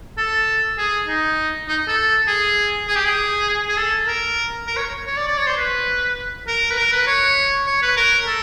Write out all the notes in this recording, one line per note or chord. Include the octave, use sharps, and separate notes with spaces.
A4
G#4
D#4
D#4
A4
G#4
G#4
G4
G#4
G#4
A4
A#4
A#4
C#5
C#5
D5
D5
C#5
C5
B4
A#4
B4
A#4
B4
C#5
C#5
B4
A#4
A4